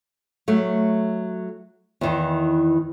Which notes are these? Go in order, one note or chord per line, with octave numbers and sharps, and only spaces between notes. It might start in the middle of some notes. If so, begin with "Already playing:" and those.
F#3 A3
E2 D#3 E3